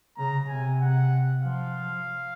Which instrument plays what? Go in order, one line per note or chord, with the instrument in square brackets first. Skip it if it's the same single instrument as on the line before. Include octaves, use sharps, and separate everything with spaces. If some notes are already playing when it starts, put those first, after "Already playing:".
[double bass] C#3 [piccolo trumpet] A#5
[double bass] C3 [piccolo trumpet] G#5
[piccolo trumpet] F#5
[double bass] F3 [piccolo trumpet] F5